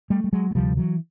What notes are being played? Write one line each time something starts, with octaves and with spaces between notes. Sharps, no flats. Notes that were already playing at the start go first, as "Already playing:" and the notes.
G3 A3
G3
F#3 G#3
G#3
D2 C3 F3 G3
E3 F#3